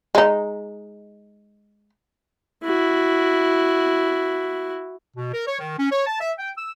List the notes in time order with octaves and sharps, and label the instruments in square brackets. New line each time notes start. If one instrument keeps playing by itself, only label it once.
[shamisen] G#3 D#4
[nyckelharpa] E4 F#4
[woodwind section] B2
A#4
C#5
D#3
C#4
C#5
A5
E5
G5
E6